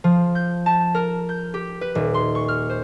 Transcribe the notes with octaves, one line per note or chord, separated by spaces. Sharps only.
F3
G6
A5
A#4
G6
G4
B4
D#1
C6
C#6
F6
C5